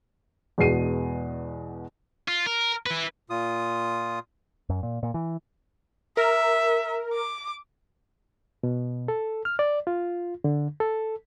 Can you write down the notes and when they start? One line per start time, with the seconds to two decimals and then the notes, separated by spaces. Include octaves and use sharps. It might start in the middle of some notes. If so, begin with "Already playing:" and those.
0.58 E2 B2 G#3 C7 D#7
2.28 F4
2.46 A#4
2.86 E4 B4
3.30 A#2 F4 D#6
4.69 F#2
4.83 A#2
5.03 A#2
5.14 E3
6.17 A#4 E5
7.14 D6
8.63 B2
9.08 A4
9.45 F6
9.59 D5
9.87 F4
10.44 D3
10.80 A4